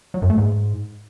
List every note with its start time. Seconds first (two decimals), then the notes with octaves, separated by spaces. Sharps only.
0.14 F#3
0.22 F#2
0.30 A3
0.38 G#2